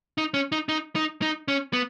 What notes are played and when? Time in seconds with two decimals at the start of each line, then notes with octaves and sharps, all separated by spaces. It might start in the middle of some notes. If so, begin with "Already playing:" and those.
0.18 D#4
0.34 C#4
0.52 D#4
0.69 D#4
0.96 D#4
1.22 D#4
1.48 C#4
1.73 B3